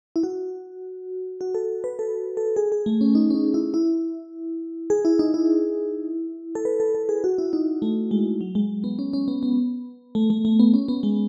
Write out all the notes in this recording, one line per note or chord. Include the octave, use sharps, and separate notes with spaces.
E4
F#4
F#4
A4
B4
A4
A4
G#4
G#4
A3
C#4
D#4
C#4
D#4
E4
E4
G#4
E4
D#4
E4
A4
B4
A4
A4
G#4
F#4
E4
D#4
A3
G#3
F#3
G#3
B3
C#4
C#4
B3
B3
A3
A3
A3
B3
C#4
B3
G#3